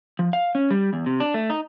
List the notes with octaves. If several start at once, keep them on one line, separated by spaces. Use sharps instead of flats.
F3
F5
C#4
G3
E2
C3
D4
A3
D#4